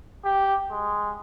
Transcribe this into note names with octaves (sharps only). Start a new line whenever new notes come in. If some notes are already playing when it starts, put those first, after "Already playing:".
G4
G#3